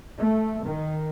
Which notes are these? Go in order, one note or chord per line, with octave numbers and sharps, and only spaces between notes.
A3
D#3